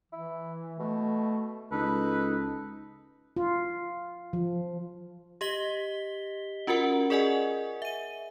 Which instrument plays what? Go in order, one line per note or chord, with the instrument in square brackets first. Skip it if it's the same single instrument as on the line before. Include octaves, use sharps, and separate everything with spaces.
[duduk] E3 [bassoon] E4
[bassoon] B2 [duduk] A3
[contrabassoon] C#2 [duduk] D#4 [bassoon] A4 [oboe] B4
[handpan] F4
F3
[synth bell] G4 D#5 B6 G7
C#4 F4 F#4 A#4 F#5
G#4 A#4 D5 D#5 F#5 G#5
E5 D#7